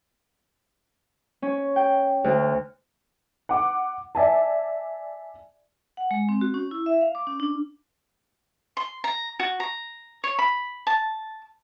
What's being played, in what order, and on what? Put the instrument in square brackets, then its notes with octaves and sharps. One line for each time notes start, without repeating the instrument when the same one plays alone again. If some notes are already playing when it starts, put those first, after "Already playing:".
[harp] C#4
G5
D2
[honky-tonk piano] F#5 D6
D5 E5 G#5 A5
[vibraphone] F#5
G#3
C4
F#4
C#4
E4
E5
F5
D6
C#4
D4
[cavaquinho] C6
A#5
F#4
A#5
C#5
B5
A5